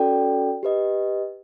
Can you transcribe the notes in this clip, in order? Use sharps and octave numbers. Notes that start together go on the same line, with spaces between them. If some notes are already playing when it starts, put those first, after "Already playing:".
Already playing: C#4 F#4 A4 D5 G5
G4 B4 D#5